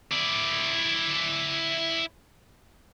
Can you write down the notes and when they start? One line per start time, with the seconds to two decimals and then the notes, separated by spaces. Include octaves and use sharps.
0.11 E4 D5